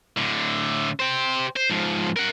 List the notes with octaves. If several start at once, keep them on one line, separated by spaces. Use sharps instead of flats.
A2 D3
G4 C5
C5
G#2 F3
A#4 F#5